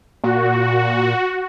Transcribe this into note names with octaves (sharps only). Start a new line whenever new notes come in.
A#2 F#4